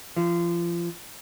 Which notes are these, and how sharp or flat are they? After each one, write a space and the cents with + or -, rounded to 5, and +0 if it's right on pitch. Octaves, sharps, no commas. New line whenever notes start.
F3 -30